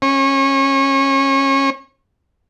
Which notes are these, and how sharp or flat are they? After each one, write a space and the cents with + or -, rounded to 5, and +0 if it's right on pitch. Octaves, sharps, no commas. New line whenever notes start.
C#4 -25